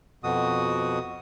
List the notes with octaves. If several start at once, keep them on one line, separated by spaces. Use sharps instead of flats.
F2 B2 F#4 D#6